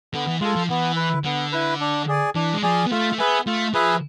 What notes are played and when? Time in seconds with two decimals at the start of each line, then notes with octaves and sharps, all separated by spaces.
0.14 D3 B3
0.27 E3
0.41 G#3 F4 A4
0.56 F3
0.70 E3 B3
0.96 E4 B4
1.25 D3 B3
1.52 E4 B4
1.80 D4
2.08 G#4 D5 G#5
2.35 E3 D4
2.54 G#3
2.63 F3 G#4 D5 G#5
2.86 B3
2.91 A3 F4
3.13 A3
3.18 B3 G#4 B4 E5 G#5
3.46 A3 F4
3.74 F3 G#4 B4 E5 G#5